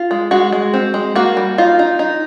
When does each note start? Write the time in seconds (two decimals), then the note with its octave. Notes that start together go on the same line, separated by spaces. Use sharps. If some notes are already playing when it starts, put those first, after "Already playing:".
Already playing: F4
0.11 G#3
0.31 G#3 F#4
0.52 G#3
0.73 C4
0.94 G#3
1.16 A#3 F#4
1.37 G3
1.58 D#4 F4
1.79 D#4
1.99 D#4